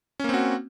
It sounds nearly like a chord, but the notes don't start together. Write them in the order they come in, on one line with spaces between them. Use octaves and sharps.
C#4 A#3 C4 F#4